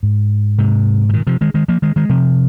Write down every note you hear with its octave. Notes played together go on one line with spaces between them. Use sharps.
G#2
G#2 C3
C3
A#2 D#3
C3 F3
D#3 G#3
D#3 G#3
F3 A#3
D#3 G#3
D#3 G#3
C3 F3